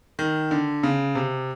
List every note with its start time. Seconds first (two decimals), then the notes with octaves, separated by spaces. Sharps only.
0.19 D#3
0.51 D3
0.83 C#3
1.15 C3